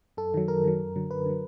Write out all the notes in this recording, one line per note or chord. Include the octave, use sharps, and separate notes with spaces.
F#2 A4
D#3 F#3
F#2 A#4
D#3 F#3
F#2
D3 F#3
F#2 B4
D3 F#3